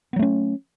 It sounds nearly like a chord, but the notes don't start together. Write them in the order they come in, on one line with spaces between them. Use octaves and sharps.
B3 F#3 A3 C#4